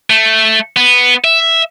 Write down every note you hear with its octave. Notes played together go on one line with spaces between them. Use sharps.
A3
B3
E5